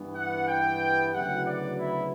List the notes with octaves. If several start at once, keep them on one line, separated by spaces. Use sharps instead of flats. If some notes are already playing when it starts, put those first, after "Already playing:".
Already playing: G2 E3 B3
F#5
G5
D2 C#3 F#3 B3 E4 F#5
D5
E4